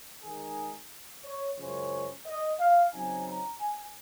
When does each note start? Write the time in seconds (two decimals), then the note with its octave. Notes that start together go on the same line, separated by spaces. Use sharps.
0.23 D#3 G#3 D#4 G#4
1.24 C#5
1.58 F#2 C#3 F3 G#3 C#4 C#5
2.26 D#5
2.59 F5
2.93 C#3 F#3 C4 D#4 G#5
3.27 A#5
3.61 G#5